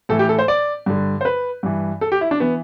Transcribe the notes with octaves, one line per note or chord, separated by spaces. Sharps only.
A2 E3 A4
G4
A4
C5
D5
G2 D3
C5
B4
G2 E3
A4
G4
E4
D4
E3 B3